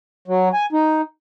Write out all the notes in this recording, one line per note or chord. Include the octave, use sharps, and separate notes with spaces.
F#3
G#5
D#4